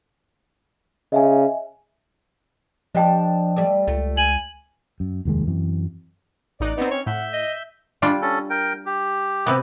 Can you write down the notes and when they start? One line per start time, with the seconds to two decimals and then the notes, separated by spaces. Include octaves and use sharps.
1.12 C#3 D#5 E5 G#5
2.95 F3 D4 G4 D5 D#5 G5 A5
3.56 G3 A3 D5
3.88 C#2 A3 F4
4.17 G#5 F#7
5.00 F#2
5.25 F1 D#2 D#3 G#3
5.47 F#2 E3 C4
6.60 A1 D#4 D5 F#6
6.78 B3 C4 D#4
6.91 C#4 C#5
7.06 A2 E5 F#5 G6
7.33 D#5
8.02 G3 D4 F4
8.22 C#4 A4
8.50 A#4 G5
8.86 G4
9.46 C3 B3